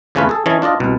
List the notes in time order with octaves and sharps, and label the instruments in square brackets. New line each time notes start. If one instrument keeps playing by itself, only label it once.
[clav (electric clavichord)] E2 C#3 A3 C#4 F4 B4
G#4 A4
E3 C#4 D#5 G#5 A5
D4 F4 D5 D#5
C2 B2